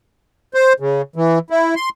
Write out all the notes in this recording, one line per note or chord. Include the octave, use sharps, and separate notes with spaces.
C5
C#3
E3
E4
C6